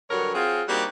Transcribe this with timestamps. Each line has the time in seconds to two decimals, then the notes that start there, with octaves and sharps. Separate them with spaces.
0.10 G2 D3 F#3 A#4 C#5
0.34 F#3 C4 F4 G#4
0.69 G3 A#3 C4 D4 D#4 F#4